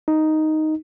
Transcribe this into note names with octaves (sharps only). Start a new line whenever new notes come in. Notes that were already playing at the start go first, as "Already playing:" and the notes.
D#4